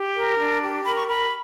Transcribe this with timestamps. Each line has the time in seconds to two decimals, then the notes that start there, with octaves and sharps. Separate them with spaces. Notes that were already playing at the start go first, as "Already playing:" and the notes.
Already playing: G4
0.15 A#4
0.38 D4
0.61 G4
0.84 A#4 B5
0.95 C#6
1.06 A#4 B5